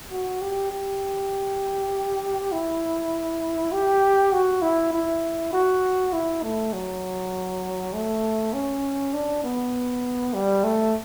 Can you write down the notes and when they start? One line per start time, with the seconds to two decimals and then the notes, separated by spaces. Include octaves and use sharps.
0.11 F#4
0.41 G4
0.71 G4
2.52 E4
3.72 G4
4.33 F#4
4.62 E4
4.93 E4
5.53 F#4
6.13 E4
6.43 A3
6.73 F#3
7.93 A3
8.53 C#4
9.14 D4
9.44 B3
10.34 G3
10.64 A3